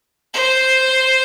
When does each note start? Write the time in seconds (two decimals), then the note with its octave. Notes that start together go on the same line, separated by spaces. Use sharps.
0.34 C5